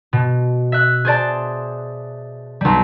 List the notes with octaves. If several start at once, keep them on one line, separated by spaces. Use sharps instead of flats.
B2
E5 F#6
G#4 C5 D5 A5
B1 G3